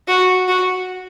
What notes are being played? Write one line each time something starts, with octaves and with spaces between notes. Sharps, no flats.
F#4
F#4